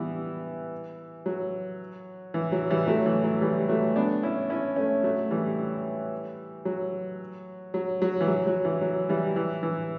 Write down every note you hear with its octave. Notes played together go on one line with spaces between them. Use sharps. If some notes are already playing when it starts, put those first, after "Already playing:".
Already playing: E3 G3 B3
F#3
E3
F#3
E3 G3
F#3 A3
E3
F#3
E3 G3
F#3 A3
B3 D4
C#4 E4
C#4 E4
A3 C#4
F#3 A3
E3 G3
F#3
F#3
F#3
E3
F#3
F#3
E3
F#3
E3 G3
E3
E3